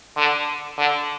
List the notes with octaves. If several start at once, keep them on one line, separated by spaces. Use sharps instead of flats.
D3
D3